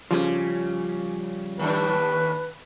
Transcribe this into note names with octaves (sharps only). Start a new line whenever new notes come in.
C#3 F3 G3 C#4
D#2 A2 D4 B4